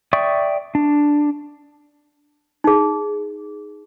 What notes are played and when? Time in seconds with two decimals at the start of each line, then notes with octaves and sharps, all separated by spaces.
0.13 D5 E5 G5 C#6 D#6
0.75 D4
2.64 D#4 G#4